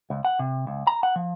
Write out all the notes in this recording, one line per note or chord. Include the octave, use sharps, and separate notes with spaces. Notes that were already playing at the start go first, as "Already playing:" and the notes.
C#2
F#5
C3
C#2
A#5
F#5
F3